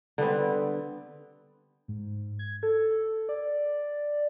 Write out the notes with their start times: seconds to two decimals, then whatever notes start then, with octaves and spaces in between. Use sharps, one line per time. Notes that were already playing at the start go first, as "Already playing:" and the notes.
0.18 D3 G3 B3 C4
1.88 G#2
2.39 G#6
2.63 A4
3.29 D5